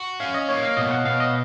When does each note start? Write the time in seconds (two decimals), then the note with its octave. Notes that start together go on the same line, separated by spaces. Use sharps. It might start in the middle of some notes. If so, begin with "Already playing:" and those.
Already playing: F#4
0.20 C#4 F5
0.34 D#5
0.49 A#3 C#5
0.63 F5
0.77 B2 D#5
0.91 F#5
1.05 B2 F5
1.20 D#5